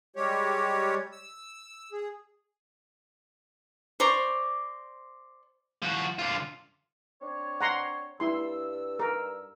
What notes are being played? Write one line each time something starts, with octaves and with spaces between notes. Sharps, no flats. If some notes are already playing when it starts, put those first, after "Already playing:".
G3 G#3 G4 C#5
E6
G#4
C5 D5 A#5 C#6
F3 F#4
D3 F4
C4 D4 C#5
F#5 A#5 C6
G2 E4 C6 E6
A#4